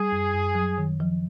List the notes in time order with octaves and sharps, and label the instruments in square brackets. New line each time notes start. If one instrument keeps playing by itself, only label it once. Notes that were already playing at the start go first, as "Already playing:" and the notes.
Already playing: [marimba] G3 [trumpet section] G#4
[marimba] F#2
F#2
F#3
D#3
F3